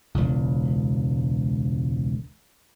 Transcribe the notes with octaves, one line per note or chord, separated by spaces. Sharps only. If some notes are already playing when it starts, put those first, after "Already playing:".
E1 C#2